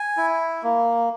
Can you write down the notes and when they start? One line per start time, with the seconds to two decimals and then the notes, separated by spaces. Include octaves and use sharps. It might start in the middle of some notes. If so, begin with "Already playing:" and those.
Already playing: G#5
0.17 E4
0.63 A#3